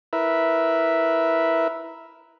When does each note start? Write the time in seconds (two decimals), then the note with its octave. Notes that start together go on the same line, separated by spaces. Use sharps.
0.13 E4 A#4 B4 E5